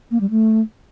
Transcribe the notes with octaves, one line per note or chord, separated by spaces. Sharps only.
A#3
G3
A3